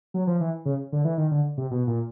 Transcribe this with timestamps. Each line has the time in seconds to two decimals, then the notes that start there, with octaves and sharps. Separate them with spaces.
0.14 F#3
0.27 F3
0.41 E3
0.66 C#3
0.92 D3
1.05 E3
1.18 D#3
1.31 D3
1.58 C3
1.71 B2
1.87 A#2